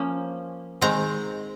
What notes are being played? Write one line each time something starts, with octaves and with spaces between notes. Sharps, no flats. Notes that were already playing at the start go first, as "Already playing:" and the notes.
Already playing: F3 A#3 C#4
D#3 G#3 C4 A#5